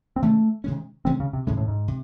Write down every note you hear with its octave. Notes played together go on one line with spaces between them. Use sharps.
C4
C3 D#3 G#3 A3 C#4
C3 D#3 G#3 C#4
C3 D#3 G#3 C4 C#4
C#3
C3
A2 C3 D#3 G#3 C#4
A2
G#2
C3